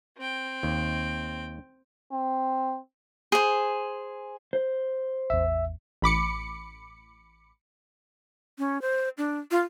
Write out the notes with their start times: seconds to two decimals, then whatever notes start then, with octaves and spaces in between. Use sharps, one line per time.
0.17 C4 G5
0.63 D#2
2.12 C4
3.32 G#4 C5
4.53 C5
5.30 A1 E2 E5
6.02 A1 B5 D6 C#7
8.58 C#4
8.82 C5
9.18 D4
9.51 F4